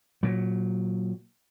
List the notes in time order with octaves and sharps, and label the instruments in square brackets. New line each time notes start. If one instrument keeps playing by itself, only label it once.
[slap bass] A#2 F#3